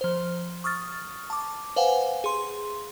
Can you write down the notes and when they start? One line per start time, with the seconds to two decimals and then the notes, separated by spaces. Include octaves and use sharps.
0.01 F3 C5
0.64 C#6 D#6 F6 A6
1.30 A5 D6
1.76 B4 C5 F5 F#5 G#5
2.24 G#4 C6